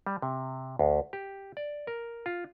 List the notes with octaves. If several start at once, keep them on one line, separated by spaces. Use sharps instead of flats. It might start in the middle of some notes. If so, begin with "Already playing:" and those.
G3
C3
D2
G4
D5
A#4
F4